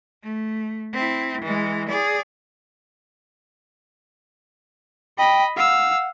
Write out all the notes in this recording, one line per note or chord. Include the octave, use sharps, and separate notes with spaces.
A3
C4 E4
E3 G#3
G#4 D5
D#5 G5 B5
F5 F#5 E6